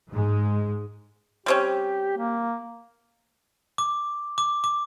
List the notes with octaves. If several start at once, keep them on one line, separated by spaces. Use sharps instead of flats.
G#2 G#3
G3 C4 C#4 G4
A#3
D6
D6
D6